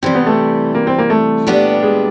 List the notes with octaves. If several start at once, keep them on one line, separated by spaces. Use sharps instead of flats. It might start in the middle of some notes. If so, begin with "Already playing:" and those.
C3 E3 G3 C4
B3
A3
A#3
C4
A#3
A3
A#2 G3 B3 D4 G4
G#3